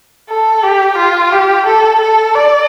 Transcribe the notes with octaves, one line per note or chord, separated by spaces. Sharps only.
A4
G4
F4
G4
A4
A4
D5